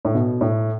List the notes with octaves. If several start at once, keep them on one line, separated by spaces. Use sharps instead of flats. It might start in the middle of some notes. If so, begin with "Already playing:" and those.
A2
B2
A2